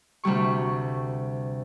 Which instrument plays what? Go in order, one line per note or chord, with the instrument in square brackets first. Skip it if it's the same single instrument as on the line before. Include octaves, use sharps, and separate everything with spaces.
[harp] D2 C3 G3 C#6